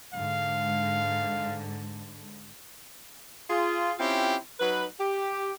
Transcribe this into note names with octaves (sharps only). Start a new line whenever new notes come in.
G#2 D3 F5
F4 G#4
C4 C#4 E4 F4 G4
F#3 D#4 B4
G4